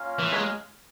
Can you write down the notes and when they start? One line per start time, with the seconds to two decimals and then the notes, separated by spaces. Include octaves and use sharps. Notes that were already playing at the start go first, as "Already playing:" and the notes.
Already playing: A#3 C#4 F4 A#4 F5
0.19 E3
0.33 G#3